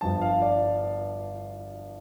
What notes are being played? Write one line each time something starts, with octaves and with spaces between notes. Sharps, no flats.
G1 G2 F3 A5
F5
D5